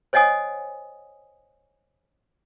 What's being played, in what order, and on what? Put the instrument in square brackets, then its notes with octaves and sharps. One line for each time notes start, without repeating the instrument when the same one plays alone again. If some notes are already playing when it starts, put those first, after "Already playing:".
[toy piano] C5 C#5 D#5 F#5 G#5 D#6